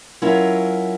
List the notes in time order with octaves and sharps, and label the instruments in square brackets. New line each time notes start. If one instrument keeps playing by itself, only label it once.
[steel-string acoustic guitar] F#3 C#4 E4 F4 A#4